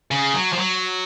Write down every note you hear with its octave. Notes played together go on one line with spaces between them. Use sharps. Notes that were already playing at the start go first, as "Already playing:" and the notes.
C#3
F#3
F3
F#3